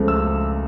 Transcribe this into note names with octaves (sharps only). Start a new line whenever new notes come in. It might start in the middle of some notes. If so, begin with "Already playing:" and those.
Already playing: C#2 C#3 F3 A3
E6